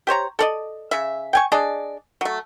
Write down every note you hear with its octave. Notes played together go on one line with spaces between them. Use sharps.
G4 C5 C#5 A#5
A4 D5 D#5
C#3 E5
G5 G#5 C#6
D4 G#4 D5 D#5
F#3 A3